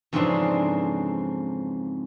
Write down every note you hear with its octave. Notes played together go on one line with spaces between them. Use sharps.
F2 G#2 C#3 E3 C4 D4